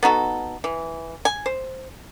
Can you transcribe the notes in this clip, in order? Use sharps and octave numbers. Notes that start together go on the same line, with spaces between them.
B3 D#4 F#4 A4
E3
G#5
C5